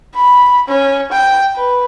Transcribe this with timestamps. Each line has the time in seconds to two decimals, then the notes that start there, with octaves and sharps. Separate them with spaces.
0.15 B5
0.68 C#4
1.12 G5
1.56 B4